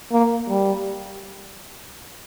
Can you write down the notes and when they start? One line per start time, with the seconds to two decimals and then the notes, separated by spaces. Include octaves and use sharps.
0.12 A#3
0.49 G3